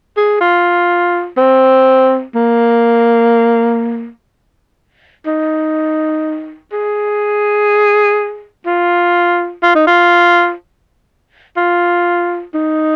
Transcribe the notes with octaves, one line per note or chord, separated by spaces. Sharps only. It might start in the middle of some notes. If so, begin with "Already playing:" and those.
G#4
F4
C4
A#3
D#4
G#4
F4
F4
D#4
F4
F4
D#4